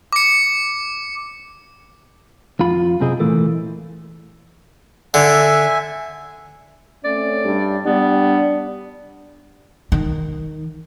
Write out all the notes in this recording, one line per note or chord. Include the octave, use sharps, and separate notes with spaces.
D6 C#7
F2 F4 B5
F#2 C3 C4 G#4 D#5
A#2 E3 A3 A#3
D3 E5 G#5
A3 C4 C#4 D5
G2
G3 B3 D4
D#3